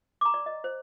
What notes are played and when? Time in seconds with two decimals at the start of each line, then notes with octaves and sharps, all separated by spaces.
0.21 A#5 D6
0.34 D5
0.46 D#5
0.64 C5